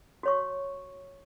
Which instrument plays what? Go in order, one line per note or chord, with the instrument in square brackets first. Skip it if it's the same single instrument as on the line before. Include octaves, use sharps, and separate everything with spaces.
[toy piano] F#4 C#5 C#6